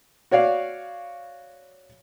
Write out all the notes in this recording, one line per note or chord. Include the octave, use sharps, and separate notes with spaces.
F#4 C#5 D5 F5